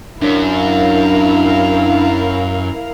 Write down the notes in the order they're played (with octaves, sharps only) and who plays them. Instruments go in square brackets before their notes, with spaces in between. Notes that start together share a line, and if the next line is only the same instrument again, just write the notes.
[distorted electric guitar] F#2 [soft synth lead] D4 [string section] E4 A#4 F5